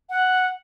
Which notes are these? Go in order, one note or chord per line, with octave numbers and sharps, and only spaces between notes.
F#5